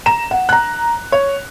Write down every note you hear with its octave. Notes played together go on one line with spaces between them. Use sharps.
A#5 E7
F#5
A#5 F#6
C#5